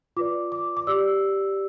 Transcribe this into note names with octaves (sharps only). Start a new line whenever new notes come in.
F4 B4 D5 D6
D6
D6
G4 D5 E6